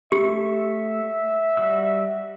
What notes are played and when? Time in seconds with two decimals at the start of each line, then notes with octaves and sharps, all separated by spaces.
0.12 A3 G4 E5 C#6
1.57 G3 F#4 E6